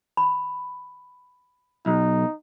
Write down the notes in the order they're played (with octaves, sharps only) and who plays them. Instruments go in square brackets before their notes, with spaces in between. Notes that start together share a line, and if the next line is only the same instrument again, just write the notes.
[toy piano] B5
[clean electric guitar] B1 [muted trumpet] D#4